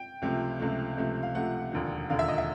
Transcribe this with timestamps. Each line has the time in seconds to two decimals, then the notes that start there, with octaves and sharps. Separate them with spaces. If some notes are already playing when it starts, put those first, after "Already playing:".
Already playing: G5
0.22 C#2 C3 F3 A3
0.60 C#2 C3 F3 A3
0.98 C#2 C3 F3 A3
1.23 F5
1.35 C#2 C3 F3 A3 F#5
1.72 E1 D#2 D3 F3
2.09 E1 D#2 D3 F3 F5
2.19 E5
2.28 D#5
2.38 E5